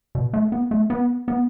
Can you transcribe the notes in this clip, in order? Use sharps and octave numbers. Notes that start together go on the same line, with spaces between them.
B2
A3
B3
A3
B3
B3